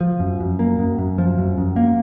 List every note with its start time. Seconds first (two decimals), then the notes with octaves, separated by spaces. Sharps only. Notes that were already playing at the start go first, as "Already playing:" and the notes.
0.01 F3
0.20 F#2
0.40 F#2
0.59 A#3
0.79 F#2
0.98 F#2
1.18 F3
1.38 F#2
1.58 F#2
1.76 A#3